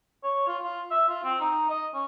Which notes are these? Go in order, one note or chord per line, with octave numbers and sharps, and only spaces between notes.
C#5
F4
F4
E5
F4
C4
D#4
D#5
C#4